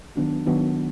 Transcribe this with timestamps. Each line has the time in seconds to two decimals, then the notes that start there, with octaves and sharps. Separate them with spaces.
0.16 D#3 F#3 B3 D4 F#4
0.47 D#3 F#3 B3 D4 F#4